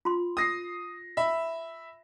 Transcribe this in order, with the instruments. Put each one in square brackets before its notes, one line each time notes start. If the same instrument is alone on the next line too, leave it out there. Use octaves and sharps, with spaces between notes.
[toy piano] F4 C6
[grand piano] D#6 A#6 C7
E5 B5